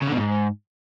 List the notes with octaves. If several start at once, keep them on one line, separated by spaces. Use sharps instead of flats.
C#3
D3
B2
G#2